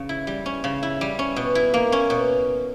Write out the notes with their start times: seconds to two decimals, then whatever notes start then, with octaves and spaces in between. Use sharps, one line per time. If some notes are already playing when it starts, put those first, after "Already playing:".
Already playing: C#3 C#4
0.09 E4
0.27 G3
0.46 C#4
0.64 C#3
0.83 E4
1.01 G3
1.19 C#4
1.36 B2
1.55 E4
1.74 A#3
1.92 C#4
2.10 B2